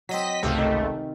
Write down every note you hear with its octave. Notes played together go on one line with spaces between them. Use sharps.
F#3 C4 D#5 B6
G#1 C#2 C3 A3 F5
D#3